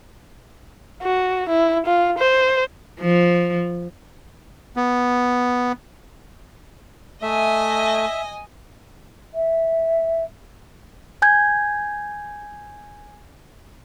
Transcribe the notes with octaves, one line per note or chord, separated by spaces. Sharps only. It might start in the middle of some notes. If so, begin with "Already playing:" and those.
F#4
E4
F4
C5
F3
B3
A3 D#5 E5 G#5
E5
G#5 G6 G#6